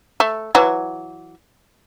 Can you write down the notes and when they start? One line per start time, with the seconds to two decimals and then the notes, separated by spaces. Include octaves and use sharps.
0.20 A3
0.55 E3 F#3